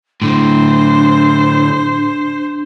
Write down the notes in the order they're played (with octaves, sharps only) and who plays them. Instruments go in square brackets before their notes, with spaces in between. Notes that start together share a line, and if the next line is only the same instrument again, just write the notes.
[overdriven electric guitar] A2 D3 [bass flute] D4 [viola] C5